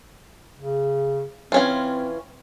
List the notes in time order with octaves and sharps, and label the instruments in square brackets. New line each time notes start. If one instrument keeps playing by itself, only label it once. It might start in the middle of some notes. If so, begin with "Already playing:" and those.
[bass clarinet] C#3
[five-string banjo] E3 C#4 F4 [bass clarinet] C4